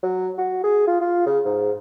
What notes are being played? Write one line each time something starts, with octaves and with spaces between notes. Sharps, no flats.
F#3
F#4
G#4
F4
F4
C#3
G#2